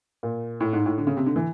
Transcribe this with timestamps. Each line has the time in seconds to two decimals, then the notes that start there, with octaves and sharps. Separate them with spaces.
0.23 A#2
0.60 A2
0.73 G#2
0.86 A2
0.98 D3
1.07 C#3
1.17 C3
1.26 D3
1.36 E3